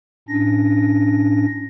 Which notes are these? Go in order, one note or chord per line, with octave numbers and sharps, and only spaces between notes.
A2 C#4 D4 A#6